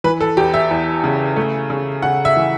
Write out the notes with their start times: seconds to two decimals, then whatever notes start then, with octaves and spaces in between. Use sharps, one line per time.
0.04 E3 B4
0.21 A4
0.37 E2 G4
0.54 E5
0.71 E2
1.04 C#3
1.36 A3
1.70 C#3
2.02 C#3 F#5
2.25 E5
2.36 E3